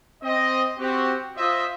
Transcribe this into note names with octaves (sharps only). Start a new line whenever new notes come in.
C4 D#5
C4 F#4 G4
F4 C5 D#5 E5